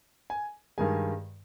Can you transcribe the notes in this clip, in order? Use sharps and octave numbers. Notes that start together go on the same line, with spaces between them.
G#5
G2 D#3 G#3 G#5